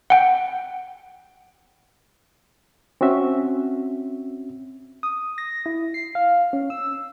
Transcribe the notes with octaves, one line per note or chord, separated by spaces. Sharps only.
F#5 G5
C4 C#4 F#4 E5
D#6
A#6
E4
C7
F5
C#4
E6